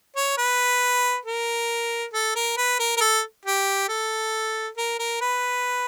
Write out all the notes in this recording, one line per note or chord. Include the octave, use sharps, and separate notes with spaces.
C#5
B4
A#4
A4
A#4
B4
A#4
A#4
A4
G4
A4
A#4
A#4
B4